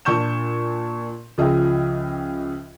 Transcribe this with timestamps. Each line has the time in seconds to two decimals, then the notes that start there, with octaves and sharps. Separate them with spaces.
0.05 A#2 D4 C#6 G6 E7
1.38 C#2 F3 G#4 D#5 E5 G5